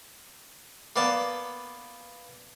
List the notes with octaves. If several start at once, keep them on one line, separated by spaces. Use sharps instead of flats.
A#3 B3 D5 A5